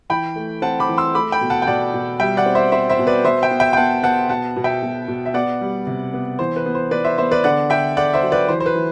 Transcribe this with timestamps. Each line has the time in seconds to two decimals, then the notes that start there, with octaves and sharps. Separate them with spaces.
0.10 E3 G5 B5
0.36 A3
0.62 C4 F#5 A5
0.80 B5 D6
0.89 E3
0.98 C6 E6
1.14 A3 B5 D6
1.32 G5 B5
1.41 B2
1.50 F#5 A5
1.62 G5
1.67 B2 D5 F#5
1.94 B2
2.20 G3 E5 G5
2.37 D5 F#5
2.46 C4
2.55 C5 E5
2.72 C4 C5 E5
2.90 C5 E5
2.99 B2
3.07 B4 D5
3.24 B3 C5 E5
3.42 E5 G5
3.51 B3
3.60 E5 G5
3.73 G5
3.77 B3 F#5 A5
4.03 B3 F#5 A5
4.29 B2 F#5 A5
4.56 B2
4.64 E5 G5
4.82 B2
5.08 B2
5.26 E5
5.34 B3 D5 F#5
5.61 G3
5.87 C3
6.14 B3
6.39 E3 C5
6.56 B4
6.66 B3
6.75 C5
6.91 B3 B4 D5
7.04 C5 E5
7.18 B3 C5 E5
7.31 B4 D5
7.44 D3 D5 F#5
7.70 D3 E5 G5
7.97 D3 D5 F#5
8.14 C5 E5
8.23 F#3
8.32 B4 D5
8.48 E3 C5
8.60 C5
8.66 B4
8.75 E3